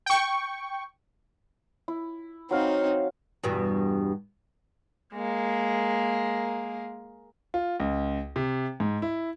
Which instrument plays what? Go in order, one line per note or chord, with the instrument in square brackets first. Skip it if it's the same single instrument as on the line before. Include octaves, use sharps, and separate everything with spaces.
[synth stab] G5 C#6
[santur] E4
[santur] F#3 F5 [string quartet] C4 D#4
[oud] E2 G2 B2
[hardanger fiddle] G#3 A#3
[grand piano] F4
C#2
C3
G#2
E4